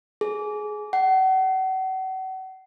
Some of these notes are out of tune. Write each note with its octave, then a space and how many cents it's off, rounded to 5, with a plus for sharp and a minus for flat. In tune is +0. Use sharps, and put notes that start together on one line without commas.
G#4 +20
F#5 +35